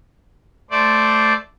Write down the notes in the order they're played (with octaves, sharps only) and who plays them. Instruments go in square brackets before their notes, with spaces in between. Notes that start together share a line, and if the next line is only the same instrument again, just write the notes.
[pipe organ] A3 C5 D5